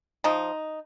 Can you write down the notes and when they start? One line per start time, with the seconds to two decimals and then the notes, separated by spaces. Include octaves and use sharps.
0.24 F3 D#4